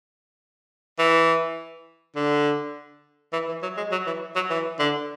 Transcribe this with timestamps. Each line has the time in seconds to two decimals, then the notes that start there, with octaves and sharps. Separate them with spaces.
0.99 E3
2.16 D3
3.33 E3
3.49 E3
3.63 F#3
3.77 G#3
3.92 F#3
4.07 E3
4.35 F#3
4.50 E3
4.79 D3